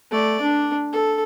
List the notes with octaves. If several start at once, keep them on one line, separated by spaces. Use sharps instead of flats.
A3 D5
D4
A4